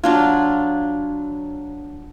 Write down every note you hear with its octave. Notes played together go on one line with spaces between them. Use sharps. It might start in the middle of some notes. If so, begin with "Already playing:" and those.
F#3 D4 F4